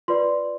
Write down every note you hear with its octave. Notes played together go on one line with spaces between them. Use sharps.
F4 B4 D5 C6